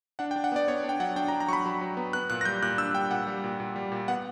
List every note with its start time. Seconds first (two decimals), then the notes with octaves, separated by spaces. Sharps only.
0.19 D4 F#5
0.31 G5
0.36 D4
0.44 F#5
0.52 B3 D5
0.68 B3 C#5
0.84 D4
0.89 G5
1.00 F#3 F#5
1.16 D4 G5
1.28 A#5
1.32 D4
1.40 A#5
1.48 F#3 C#6
1.53 B5
1.66 F#3
1.81 F#3
1.97 B3
2.13 B3 F#6
2.30 A#2 F#6
2.41 A#6
2.45 G3 G6
2.62 A#2 F#6
2.78 D4 E6
2.94 G3 G5
3.11 A#2 F#5
3.27 G3
3.44 A#2
3.60 A#2
3.76 G3
3.92 A#2
4.08 B3 F#5